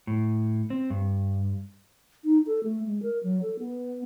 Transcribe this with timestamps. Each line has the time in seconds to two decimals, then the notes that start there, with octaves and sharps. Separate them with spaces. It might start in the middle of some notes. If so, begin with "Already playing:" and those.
0.07 A2
0.70 C4
0.90 G2
2.24 D#4
2.46 A4
2.64 A3
2.86 G#3
3.02 A#4
3.23 F#3
3.42 A4
3.59 B3